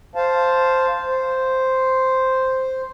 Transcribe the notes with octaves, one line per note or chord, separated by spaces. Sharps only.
C5 F5 A5
C5